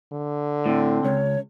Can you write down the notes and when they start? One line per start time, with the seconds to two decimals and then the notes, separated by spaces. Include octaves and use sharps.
0.12 D3
0.66 A2 C4
1.04 C#2 C#5